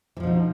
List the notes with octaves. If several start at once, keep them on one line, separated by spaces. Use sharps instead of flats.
B2 E3 F3 D#4